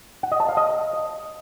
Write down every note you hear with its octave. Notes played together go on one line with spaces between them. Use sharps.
F#5
D#5
A5
F5
D#5